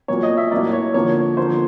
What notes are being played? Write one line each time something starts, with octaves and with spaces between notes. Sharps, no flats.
A#2 F#3 A#3 C#5
D#5
E5
A2 F#3 A#3 D5
C#5
D3 F3 A#3 C#5
D3 F3 A#3 C5